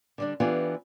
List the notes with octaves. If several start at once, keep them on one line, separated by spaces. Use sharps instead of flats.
D3 G3 D4
E3 B3 D4 F4 G4 A4